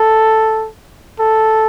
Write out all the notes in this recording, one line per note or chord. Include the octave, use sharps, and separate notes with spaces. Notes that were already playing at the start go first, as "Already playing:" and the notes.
Already playing: A4
A4